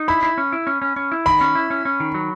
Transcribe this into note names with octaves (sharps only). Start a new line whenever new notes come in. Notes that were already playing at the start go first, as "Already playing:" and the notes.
Already playing: D#4
E4 B5
E4
C#4
E4
C#4
C#4
C#4
E4
D#3 B5
C#4
E4
C#4
C#4
D#3
F#3